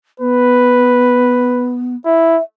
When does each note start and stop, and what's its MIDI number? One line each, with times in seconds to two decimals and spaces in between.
0.20 1.95 59
0.20 1.78 71
2.05 2.37 64
2.05 2.42 76